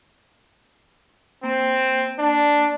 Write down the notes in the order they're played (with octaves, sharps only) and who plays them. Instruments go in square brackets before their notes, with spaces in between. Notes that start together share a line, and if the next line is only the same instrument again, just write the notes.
[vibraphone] A#3 [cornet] C4
[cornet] D4